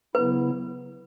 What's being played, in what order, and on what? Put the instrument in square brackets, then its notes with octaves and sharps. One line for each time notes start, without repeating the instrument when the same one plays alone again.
[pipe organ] C#3 F#3 B3 E4 [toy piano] B4